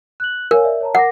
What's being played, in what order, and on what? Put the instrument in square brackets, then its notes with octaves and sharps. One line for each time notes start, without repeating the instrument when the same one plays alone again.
[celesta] F#6 F#7
[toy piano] A#4 [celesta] C#5 F5 G#5
[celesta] D5 E5
C#5 A5 A#5
[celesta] A#4 D6 A#6 [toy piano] F#5